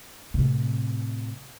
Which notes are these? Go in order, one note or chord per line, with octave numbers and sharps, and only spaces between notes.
A2 C3